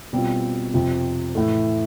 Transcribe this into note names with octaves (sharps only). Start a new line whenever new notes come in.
B2 G3 C4 F4
F2 C3 F3
A2 E3 A3